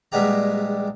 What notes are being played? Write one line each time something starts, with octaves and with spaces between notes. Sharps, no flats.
A#1 G3 G#3 B3 G4 A#5